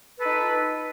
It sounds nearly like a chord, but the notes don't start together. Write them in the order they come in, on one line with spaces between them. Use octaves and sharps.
B4 A4 D#4 F4